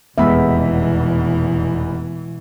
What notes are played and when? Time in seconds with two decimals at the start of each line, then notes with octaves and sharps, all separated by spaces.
0.18 F1 E2 B2 E3 G#3 B3 E5 B5